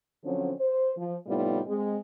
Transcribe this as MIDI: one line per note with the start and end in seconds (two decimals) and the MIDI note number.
0.24 0.51 50
0.24 0.51 53
0.24 0.51 54
0.24 0.51 60
0.24 0.51 61
0.59 0.92 72
0.97 1.15 53
1.27 1.60 45
1.27 1.60 48
1.27 1.60 55
1.27 1.60 59
1.27 1.60 63
1.27 1.60 65
1.66 1.96 56
1.66 1.96 60